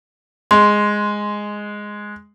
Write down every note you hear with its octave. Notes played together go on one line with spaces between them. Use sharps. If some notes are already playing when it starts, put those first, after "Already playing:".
G#3 C6